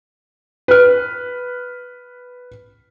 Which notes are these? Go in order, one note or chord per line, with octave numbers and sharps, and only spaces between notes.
B4 F6